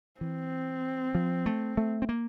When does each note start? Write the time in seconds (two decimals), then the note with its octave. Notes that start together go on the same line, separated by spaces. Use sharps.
0.20 E3 C4
1.15 F3
1.46 A3
1.77 A3
2.02 C4
2.09 A#3